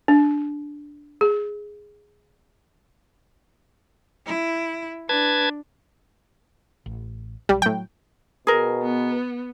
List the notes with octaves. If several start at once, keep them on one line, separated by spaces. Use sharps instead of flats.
D4
G#4
E4
D4 B4 A5 G#6
A1
B1 G3
A2 F#3 G5
B2 G#4 A#4
B3